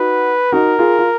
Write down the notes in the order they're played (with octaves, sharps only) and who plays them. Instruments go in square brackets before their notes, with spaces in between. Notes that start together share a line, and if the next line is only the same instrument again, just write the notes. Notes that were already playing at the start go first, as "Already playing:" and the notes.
Already playing: [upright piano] D#4 F#4 [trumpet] B4
[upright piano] D#4 F#4 [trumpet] A#4
[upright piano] F4 G#4
F4